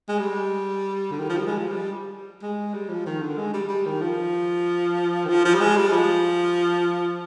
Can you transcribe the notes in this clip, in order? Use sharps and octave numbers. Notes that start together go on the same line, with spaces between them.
G#3
G3
D3
D#3
F3
G3
G#3
F3
G3
G#3
G3
F3
D#3
D3
G#3
G3
G3
D#3
F3
D#3
F3
F3
G3
G#3
G3
F3